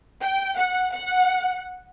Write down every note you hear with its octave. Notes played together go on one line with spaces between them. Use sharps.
G5
F#5
F#5